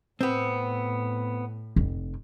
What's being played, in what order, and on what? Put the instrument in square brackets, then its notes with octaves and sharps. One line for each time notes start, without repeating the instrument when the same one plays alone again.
[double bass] A2 [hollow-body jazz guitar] B3 C4
[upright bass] F1